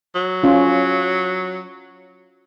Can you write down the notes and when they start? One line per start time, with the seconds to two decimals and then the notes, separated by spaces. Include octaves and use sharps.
0.15 F#3
0.44 C#4 F4